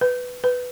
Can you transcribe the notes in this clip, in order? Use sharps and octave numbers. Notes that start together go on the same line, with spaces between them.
B4
B4